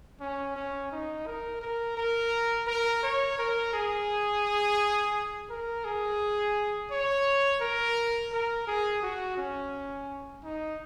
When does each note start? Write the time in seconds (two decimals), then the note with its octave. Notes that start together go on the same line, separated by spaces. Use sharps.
0.21 C#4
0.56 C#4
0.92 D#4
1.27 A#4
1.62 A#4
1.97 A#4
2.67 A#4
3.03 C#5
3.38 A#4
3.73 G#4
5.50 A#4
5.85 G#4
6.91 C#5
7.61 A#4
8.32 A#4
8.67 G#4
9.02 F#4
9.37 C#4
10.44 D#4